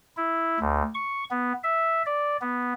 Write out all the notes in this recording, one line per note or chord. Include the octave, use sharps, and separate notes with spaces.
E4
D2
C#6
B3
E5
D5
B3